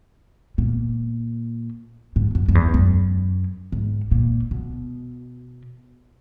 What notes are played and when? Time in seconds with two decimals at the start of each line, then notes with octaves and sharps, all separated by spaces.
0.58 A#2
2.16 G#2
2.35 F#2
2.49 F#2
2.55 E2
2.74 F#2
3.72 G#2
4.11 A#2
4.51 B2